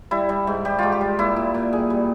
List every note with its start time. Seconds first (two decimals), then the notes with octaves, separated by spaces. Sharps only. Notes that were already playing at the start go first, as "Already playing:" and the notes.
0.11 G3 E4
0.29 G3
0.47 G#2
0.65 G3 G4
0.79 G#2 F4
0.92 G4
1.01 G3
1.19 A#2 E4
1.36 A#2
1.54 A#2
1.73 G3 G#4
1.90 G3